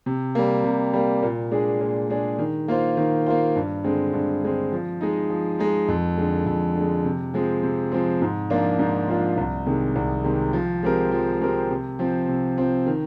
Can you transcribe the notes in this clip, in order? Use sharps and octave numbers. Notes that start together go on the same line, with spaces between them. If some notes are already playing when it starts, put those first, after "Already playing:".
C3
G3 A#3
C3
G3 A#3
A#2
G#3 D4 G#4
A#2
G#3 D4 G#4
D#3
A#3 F4 C5
D#3
A#3 F4 C5
G2
D3 G#3 C4
G2
D3 G#3 C4
F3
G#3 D#4
F3
G#3 D#4
F2
D3 G#3
F2
D3
G#3
C3
F3 G#3 C4
C3
F3 G#3 C4
G#2
F3 A#3 D4 F4
G#2
F3 A#3 D4 F4
C2
C3 D#3 G#3
C2
C3 D#3 G#3
F3
G#3 C4 G4 A#4
F3
G#3 C4 G4 A#4
C3
F3 C4
C3
F3 C4
D#3